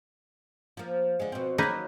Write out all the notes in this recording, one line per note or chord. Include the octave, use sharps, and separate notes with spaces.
F3 A#3
D3 G#3
B2 C4
D#3 F#3 A#3 D#4 B4